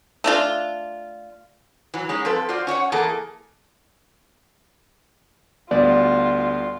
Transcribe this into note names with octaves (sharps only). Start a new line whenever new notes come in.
A3 D4 F4
E3 F#3
G#3 C#4 D#4
F3 C4 A4 B4
F4 F#4 C5 D5
C#4 C#5 E5 F#5
E3 A#3 G#4 A4
D2 G3 B3 F4 D5